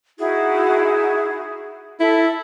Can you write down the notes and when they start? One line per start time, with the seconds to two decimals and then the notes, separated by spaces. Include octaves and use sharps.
0.19 D#4 E4 F#4 G#4
2.00 E4 A4 E5